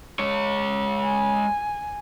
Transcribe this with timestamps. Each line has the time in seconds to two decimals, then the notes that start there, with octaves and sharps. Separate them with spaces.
0.19 G#3 C#5
1.04 G#5